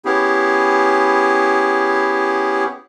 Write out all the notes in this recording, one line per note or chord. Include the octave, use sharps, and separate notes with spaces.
B3 C#4 E4 G4 G#4